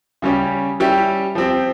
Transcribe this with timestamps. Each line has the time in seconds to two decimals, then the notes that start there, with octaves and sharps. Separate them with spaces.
0.22 C#3 G3 C#4 G4
0.80 G3 C#4 E4 G4
1.35 F3 C4 G4